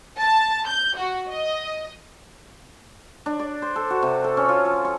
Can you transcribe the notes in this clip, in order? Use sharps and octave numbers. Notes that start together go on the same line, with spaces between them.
A5
G6
F#4
D#5
D4
D5
C5
A4
F#4
C3
A4
C#4
F4
F3
C#6